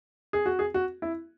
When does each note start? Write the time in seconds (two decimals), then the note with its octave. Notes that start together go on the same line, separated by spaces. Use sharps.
0.33 G#4
0.46 F#4
0.59 G#4
0.74 F#4
1.02 E4